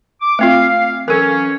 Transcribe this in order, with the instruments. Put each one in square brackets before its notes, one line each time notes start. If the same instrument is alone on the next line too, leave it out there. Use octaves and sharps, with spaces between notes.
[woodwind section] D6
[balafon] A3 C4 F4 [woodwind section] F5
[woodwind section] E3 F#3 C#4 [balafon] A4 A#4